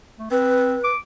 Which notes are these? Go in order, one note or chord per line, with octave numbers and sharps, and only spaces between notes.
A3
C4 B4
D6